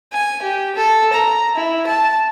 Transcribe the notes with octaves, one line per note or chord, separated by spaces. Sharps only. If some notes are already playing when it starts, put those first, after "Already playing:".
G#5
G4
A4
A#5
E4
A5